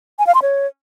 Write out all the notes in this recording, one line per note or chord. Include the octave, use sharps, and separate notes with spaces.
G#5
F5
C6
C#5